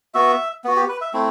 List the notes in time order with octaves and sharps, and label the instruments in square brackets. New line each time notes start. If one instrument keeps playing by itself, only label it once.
[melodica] B3 F#4 E5
B3 F#4
G4
B4
E5
A3 C4 E4